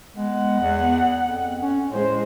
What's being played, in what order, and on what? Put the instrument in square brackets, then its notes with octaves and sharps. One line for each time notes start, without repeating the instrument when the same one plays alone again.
[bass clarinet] G#3 [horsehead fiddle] B3 F#5
[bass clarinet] E2
F2
C#4
[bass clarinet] A2 [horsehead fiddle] G#3 C5